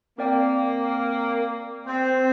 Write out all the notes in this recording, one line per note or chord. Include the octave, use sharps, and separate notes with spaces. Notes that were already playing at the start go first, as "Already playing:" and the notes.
A#3 C4 A#4 D5 G5
C4